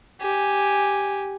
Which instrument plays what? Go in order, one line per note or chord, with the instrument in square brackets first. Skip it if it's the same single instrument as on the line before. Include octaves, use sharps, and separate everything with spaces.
[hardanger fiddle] G4 G#5